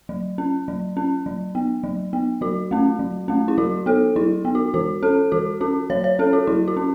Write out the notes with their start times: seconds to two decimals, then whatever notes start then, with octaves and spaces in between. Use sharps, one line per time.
0.09 F#3
0.38 C#4
0.68 F#3
0.97 C#4
1.26 F#3
1.55 B3
1.84 F#3
2.13 B3
2.41 F#3 F#4
2.71 A3 C#4
2.99 F#3
3.28 A3 C#4
3.48 E4
3.58 F#3 F#4
3.86 B3 A4
4.16 F#3 E4
4.45 B3
4.55 F#4
4.74 E3 F#4
5.03 C#4 A4
5.32 E3 F#4
5.61 C#4 F#4
5.90 F#3 C#5
6.04 C#5
6.19 C#4 A4
6.33 F#4
6.47 F#3 E4
6.68 F#4
6.77 C#4